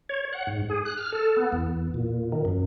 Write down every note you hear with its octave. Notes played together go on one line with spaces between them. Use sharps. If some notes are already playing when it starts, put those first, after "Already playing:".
C#5
F#5
G#2
G#4
F#6
F6
A4
B3
E2
A#2
D#3
F#2